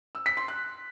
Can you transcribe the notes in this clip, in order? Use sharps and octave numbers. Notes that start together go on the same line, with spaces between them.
E6
B6
C6
F#6